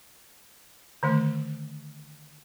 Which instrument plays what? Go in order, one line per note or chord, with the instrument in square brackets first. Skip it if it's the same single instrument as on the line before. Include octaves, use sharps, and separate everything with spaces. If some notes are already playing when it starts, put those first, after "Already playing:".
[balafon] D3 D#3 A3